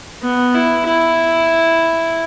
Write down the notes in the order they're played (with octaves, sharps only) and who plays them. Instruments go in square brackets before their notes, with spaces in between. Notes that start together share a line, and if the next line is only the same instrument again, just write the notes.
[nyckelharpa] B3
E4
E4